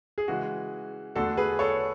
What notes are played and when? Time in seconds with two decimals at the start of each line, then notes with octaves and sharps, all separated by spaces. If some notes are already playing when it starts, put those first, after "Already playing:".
0.18 G#4
0.28 C#3 E3 G#3 F#4
1.15 E2 D3 A3 D4 F#4 A4
1.37 G#4 B4
1.59 A4 C#5